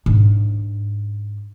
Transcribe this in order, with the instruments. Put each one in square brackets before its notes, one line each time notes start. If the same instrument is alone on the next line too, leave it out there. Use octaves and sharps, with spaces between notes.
[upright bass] G#2 D4